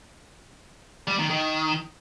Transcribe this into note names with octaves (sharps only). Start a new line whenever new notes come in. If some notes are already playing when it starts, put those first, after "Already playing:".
G3
D#3
D#3